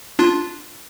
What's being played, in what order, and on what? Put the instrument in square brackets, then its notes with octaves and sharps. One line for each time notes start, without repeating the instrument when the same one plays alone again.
[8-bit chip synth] D4 F4